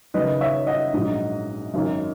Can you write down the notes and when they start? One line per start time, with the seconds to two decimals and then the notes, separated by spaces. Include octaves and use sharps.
0.14 F#1 F#2 D#3 B4 D#5
0.40 C#5 E5
0.67 D#5 F#5
0.93 A#1 G#2 F#3
1.74 G#1 F#2 D#3